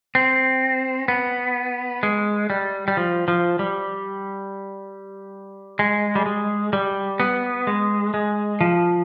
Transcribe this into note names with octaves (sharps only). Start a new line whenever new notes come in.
C4
B3
G#3
G3
G3
F3
F3
G3
G#3
G3
G#3
G3
B3
G#3
G#3
F3